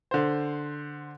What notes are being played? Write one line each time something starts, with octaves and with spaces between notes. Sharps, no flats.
D3 C5